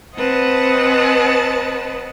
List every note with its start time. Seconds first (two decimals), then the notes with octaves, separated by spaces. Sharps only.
0.16 C4 B4 C5 D#5 F#5 A5